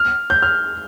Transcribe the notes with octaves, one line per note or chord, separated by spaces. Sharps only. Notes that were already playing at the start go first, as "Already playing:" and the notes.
Already playing: F6
G6
F6